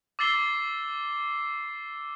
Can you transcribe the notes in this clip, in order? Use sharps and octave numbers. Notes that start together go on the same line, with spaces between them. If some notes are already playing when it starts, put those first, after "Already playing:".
D6 E6 A6 C7 G7